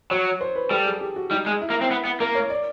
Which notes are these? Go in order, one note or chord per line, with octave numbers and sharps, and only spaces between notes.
F#3 C#5
C5
B4
G3 A4
G#4
G4
F#4
G3 D#4
G#3
E4
A#3
C4
B3
B3
A#3 A#4
C#5
D5